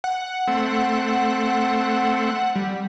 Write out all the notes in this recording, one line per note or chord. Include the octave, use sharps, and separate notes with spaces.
F#5
A3 C4
G3